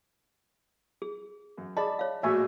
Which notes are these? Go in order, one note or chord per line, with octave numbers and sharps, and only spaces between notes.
G#4
F#2
G#4 D5 D#5 A5 B5
C#5 F5
A#1 A2 G#3 F#4 E5 G#5 C#6